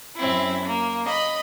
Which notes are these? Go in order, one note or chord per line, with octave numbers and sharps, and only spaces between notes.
F#2 C4 E4
A#3
D#5 B5